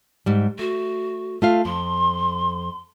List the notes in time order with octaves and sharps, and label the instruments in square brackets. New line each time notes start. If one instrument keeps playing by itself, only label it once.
[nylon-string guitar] G#2 G3
[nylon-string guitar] A3 [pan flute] F#4
[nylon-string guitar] A3 F4 F5
[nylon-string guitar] F2 [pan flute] C6